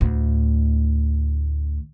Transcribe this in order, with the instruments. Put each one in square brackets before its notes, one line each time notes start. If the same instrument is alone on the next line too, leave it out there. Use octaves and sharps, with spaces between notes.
[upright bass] D2 A2